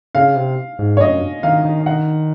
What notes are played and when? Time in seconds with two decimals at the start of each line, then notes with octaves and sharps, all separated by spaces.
0.15 C#3 F5
0.36 C3
0.79 G#2
0.97 C#5
1.01 F#2 D#5
1.43 D#3 F5
1.65 D#3
1.86 D#3 F#5